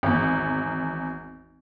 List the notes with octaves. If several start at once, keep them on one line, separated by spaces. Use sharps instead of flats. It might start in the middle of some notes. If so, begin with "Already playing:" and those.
G#1 E2